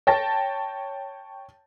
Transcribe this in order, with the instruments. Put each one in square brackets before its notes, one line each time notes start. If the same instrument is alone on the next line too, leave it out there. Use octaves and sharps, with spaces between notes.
[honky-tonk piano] C#5 G5 A5 A6 A#6